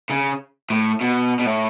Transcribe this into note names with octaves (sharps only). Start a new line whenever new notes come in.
C#3
A2
B2
B2
A2